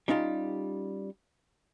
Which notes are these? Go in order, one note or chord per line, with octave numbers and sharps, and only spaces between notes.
G3 C#4 D#4 F4 G4